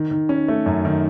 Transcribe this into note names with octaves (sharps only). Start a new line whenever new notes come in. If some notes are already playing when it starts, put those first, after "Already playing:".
Already playing: D#3
D#3
C#4
A3
F#2
D#3